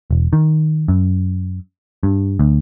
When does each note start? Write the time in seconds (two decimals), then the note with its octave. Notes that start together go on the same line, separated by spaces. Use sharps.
0.11 E1
0.33 D#3
0.88 F#2
2.03 G2
2.39 D2